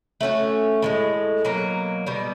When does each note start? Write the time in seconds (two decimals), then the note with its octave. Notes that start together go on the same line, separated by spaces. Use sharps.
0.21 A3 C#4 F#4
0.82 A2 E3 G#3
1.45 B2 F#3 A#3
2.07 B2 G3 B3